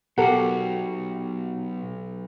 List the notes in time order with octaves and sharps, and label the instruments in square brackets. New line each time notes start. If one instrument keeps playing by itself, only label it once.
[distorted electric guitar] B1 [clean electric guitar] B2 F#4 [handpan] G4 [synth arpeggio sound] A4 A#4 F#5